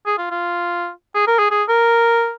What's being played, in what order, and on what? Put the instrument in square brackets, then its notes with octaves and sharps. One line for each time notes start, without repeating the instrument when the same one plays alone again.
[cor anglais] G#4
F4
F4
G#4
A#4
G#4
G#4
A#4